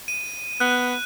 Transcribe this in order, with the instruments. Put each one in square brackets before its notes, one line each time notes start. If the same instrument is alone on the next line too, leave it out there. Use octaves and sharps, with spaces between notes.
[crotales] D#7
[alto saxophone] B3 [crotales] F#6